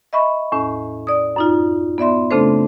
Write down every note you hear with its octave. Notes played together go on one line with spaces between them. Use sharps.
D#5 E5 B5 C#6
E2 A2 C#4
D5 D#6
F#2 D#4 F4
B3 D5 E5 C6
C#3 A3 C4 D4 A4 C5